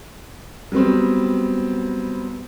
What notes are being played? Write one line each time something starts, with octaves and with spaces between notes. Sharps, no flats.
F#3 G3 B3 C4